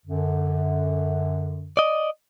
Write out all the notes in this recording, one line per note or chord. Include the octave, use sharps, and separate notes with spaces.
F#2 D3
D5 D#5